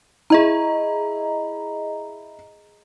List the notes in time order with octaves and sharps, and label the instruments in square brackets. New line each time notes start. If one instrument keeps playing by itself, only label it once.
[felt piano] E4 [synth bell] G#4 D#5 A#5